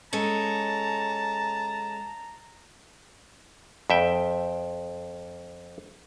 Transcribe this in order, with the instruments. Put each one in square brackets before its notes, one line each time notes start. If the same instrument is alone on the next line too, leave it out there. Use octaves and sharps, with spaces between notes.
[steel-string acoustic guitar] G#3 C#4 A4 [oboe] A5 [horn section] A#5
[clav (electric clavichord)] F2 E5 G5